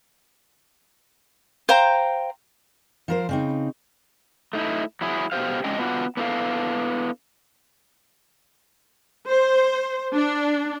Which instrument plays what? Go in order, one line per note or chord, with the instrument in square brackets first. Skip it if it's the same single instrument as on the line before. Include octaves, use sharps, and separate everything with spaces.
[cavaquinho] C5 F5 G5 A#5
[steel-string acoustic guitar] F3 A#4 C5
C#3 C4 D#4
[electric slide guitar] A3 D#4 E4
F#3 E4 G#4
B2 G4 C5 F5
G#3 C#4 D4 D#5 G5
B3 D4 F4 F#4
B3 D4 E4 A4 F5
[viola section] C5
D4